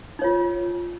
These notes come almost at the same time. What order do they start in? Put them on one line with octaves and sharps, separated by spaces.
D#4 C#5 F4